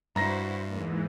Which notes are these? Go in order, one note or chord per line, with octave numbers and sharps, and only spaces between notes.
G2 E4 F#4 C5 A#5 A#6
E2 G#2 E3 G#3 A#3